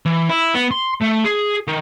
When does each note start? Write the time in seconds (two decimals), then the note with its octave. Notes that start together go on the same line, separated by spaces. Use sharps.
0.06 E3
0.30 E4
0.55 B3
0.71 C6
1.01 A3
1.24 G#4
1.67 D#3